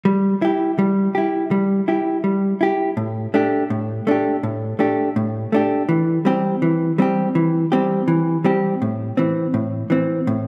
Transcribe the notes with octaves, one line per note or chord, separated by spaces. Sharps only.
G3
E4 G4
G3
E4 G4
G3
E4 G4
G3
E4 G4
A2
A3 D4 G4
A2
A3 D4 G4
A2
A3 D4 G4
A2
A3 D4 G4
E3
G3 C4 G4
E3
G3 C4 G4
E3
G3 C4 G4
E3
G3 C4 G4
A2
E3 C4
A2
E3 C4
A2